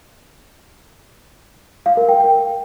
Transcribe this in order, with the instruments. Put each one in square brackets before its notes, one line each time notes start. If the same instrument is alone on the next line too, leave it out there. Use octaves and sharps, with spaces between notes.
[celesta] F5
A#4
G5
G5